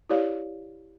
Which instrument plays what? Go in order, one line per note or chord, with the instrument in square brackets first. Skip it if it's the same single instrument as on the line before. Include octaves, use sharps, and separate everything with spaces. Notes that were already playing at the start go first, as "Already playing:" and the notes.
[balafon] E4 G4 C#5 D5 F5